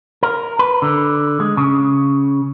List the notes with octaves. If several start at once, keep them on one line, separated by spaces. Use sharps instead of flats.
A#4
B4
D3
G#3
C#3